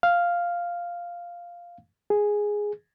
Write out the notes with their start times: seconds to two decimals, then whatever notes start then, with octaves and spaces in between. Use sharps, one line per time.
0.03 F5
2.10 G#4